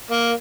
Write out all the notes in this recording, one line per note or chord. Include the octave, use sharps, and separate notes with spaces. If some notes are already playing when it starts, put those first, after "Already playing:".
A#3